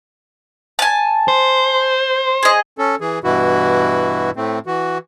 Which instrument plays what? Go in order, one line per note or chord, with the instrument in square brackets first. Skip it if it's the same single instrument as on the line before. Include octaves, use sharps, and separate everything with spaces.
[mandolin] G#5 A5
[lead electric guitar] C5
[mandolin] G#4 D#5
[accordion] C#4 A4
E3 G#4
G2 B2 E3 E4 F#4
A2 A3 C4
E3 F#4